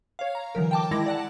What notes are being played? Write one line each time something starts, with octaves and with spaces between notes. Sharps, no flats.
C#5 F5
A#5
D3 E3 F#3 A#4
G5 A5 D6
D#3 G#3 E4 A#6
D5 F#5 A5